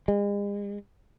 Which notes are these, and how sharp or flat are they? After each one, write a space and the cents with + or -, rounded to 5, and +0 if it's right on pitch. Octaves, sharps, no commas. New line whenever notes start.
G#3 -40